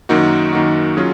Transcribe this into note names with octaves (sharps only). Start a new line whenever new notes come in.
F#2 D#3 A#3 D#4 F#4
F#2 D#3 A#3 D#4 F#4
F#3 C#4 F4 G#4